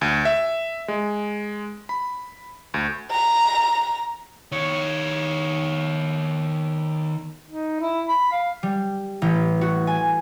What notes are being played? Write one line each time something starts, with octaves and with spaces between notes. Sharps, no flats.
D2
E5
G#3
B5
D2
A#5
D#3 C#5
D#4
E4
B5
F5
G3
A1
F#4
G#5